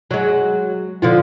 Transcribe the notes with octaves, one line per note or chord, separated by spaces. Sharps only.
F#3 G#3
D3 F3 F4